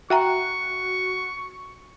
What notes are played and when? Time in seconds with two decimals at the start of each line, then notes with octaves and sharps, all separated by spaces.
0.10 F#4 E5 G5 A#5 C#6